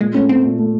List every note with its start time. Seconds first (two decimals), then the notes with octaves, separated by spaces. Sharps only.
0.01 A#2 G#3
0.14 A3 C#4
0.29 A3 C4
0.45 A#2
0.59 A3